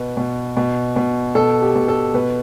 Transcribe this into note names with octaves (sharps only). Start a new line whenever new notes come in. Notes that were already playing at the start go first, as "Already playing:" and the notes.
Already playing: B2 B4
B2
B2
B2
B2 A4
G4
B2
A4
B2 B4